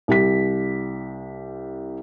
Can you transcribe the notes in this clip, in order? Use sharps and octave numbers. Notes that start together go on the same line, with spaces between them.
C2 G4 B6